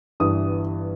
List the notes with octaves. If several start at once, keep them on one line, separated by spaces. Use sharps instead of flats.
G1 G2 E3 D#6